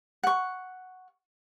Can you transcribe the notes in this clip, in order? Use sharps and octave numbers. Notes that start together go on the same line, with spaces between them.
F#5 C#6